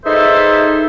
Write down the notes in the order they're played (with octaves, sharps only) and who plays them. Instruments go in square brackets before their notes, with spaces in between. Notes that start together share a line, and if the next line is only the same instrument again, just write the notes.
[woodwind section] D#4 G#4 A4 B4 C5 E5